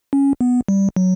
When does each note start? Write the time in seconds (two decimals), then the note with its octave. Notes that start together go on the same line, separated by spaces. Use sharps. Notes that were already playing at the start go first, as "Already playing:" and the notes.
0.13 C#4
0.41 B3
0.68 G3
0.96 F#3